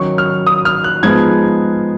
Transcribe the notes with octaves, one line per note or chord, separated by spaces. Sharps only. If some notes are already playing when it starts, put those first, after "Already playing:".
Already playing: D#3 F#3 C#4 C#6
F6
D#6
F6
F#6
F3 G#3 B3 D#4 G#6